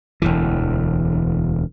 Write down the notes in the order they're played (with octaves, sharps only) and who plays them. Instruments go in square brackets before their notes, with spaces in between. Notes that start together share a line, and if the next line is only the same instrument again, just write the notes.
[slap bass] E1 D2 E3